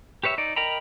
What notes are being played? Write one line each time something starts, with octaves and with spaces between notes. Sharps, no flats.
G4 B4 C#5 E5
D#4 D5
A#4 D#5 G5 A#5 B5